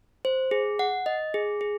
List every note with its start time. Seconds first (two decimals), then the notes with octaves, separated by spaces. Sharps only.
0.25 C5
0.51 G#4
0.79 F#5
1.06 D#5
1.34 G#4
1.61 G#4